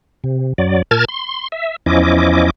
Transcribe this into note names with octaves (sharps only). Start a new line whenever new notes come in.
C3
F#2 F#3 D5
A#2 A#4 A5 F6 G#6 A6
C6
E5
E2 F3 C#4 E4 D#5 D6